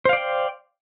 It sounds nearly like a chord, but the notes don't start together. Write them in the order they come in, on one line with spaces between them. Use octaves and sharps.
C5 F5 D5 G5